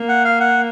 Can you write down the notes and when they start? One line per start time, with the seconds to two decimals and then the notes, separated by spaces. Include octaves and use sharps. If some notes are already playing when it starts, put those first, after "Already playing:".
Already playing: A#3
0.09 F#5
0.25 F5
0.40 F#5